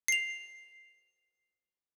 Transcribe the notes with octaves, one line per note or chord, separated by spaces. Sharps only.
C7 F7